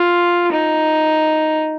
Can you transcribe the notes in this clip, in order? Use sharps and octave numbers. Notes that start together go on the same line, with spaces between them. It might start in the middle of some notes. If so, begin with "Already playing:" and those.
Already playing: F4
D#4